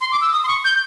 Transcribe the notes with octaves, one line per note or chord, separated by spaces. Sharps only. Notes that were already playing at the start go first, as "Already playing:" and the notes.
C6
D6
E6
D#6
C6
C#6
G6